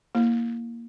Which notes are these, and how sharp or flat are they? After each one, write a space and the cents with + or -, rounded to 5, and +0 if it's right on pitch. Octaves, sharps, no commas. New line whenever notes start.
A#3 +0 E4 +0